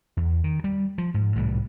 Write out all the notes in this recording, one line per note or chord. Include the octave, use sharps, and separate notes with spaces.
E2
D#3
G3
F3
G#2
C2 A2 E3 G3